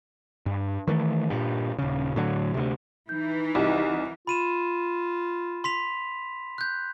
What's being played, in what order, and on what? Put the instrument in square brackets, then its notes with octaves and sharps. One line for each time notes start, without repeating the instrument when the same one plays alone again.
[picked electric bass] G2
D#3 E3 G#3 A3
G2 A#2
D#1 C#3
A2 D3 F#3
D2 C3
[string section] E3 [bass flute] D#4 [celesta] G6
[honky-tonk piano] C2 [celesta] F#4 G4 D#5
[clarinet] F4 [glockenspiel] B5 D#7 E7
[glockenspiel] C6 B6 F7
F#6 G6